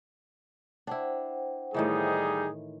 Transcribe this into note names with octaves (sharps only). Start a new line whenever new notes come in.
D4 E4 C5 F#5 G5
A2 D#3 E3 G3 D#4 G#4